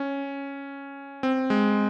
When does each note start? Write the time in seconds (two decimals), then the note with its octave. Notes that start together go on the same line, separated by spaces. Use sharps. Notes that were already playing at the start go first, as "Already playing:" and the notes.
Already playing: C#4
1.23 C4
1.50 G#3